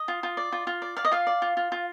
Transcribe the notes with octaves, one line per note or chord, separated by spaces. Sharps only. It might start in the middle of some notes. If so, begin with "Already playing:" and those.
Already playing: D#5
F4
F4
D5
F4
F4
D5
D5 F5
D#5
F4 F5
D5
F4
F4
F4